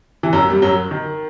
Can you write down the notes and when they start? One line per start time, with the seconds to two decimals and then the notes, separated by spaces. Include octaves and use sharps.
0.23 E3
0.33 F#2 F#3
0.50 G3
0.62 F#2 F#3
0.91 D#3